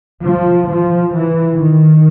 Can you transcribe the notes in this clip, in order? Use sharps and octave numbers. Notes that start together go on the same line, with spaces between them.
F3
F3
E3
D#3